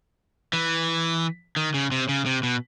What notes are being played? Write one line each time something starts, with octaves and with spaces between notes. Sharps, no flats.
E3
D#3
C#3
C3
C#3
C3
B2